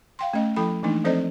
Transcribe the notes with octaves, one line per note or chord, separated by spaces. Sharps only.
F5 G5 C6
A3 C#4 D#5
F3 E4 A4 G5 B5
E3 A3 A#3 D4 D#4
F3 C4 A4 C5 D5 D#5